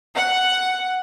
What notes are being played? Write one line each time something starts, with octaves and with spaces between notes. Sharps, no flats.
F#5